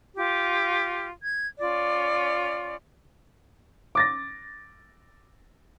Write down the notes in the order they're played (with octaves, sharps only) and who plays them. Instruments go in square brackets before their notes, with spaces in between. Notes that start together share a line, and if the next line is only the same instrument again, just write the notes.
[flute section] F4 G4
G#6
C#4 F4 D5
[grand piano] D6 A6 A#6